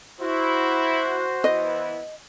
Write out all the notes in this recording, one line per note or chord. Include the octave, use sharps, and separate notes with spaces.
E4 F#4 C5
E3 B3 E4 D#5